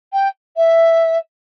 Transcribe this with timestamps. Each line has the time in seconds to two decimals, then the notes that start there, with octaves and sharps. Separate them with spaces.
0.13 G5
0.56 E5